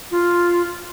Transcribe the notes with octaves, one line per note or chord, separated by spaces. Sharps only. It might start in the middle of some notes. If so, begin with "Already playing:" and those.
F4